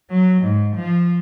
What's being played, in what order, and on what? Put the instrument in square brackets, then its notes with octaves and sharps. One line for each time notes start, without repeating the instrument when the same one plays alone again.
[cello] F#3
G#2
F3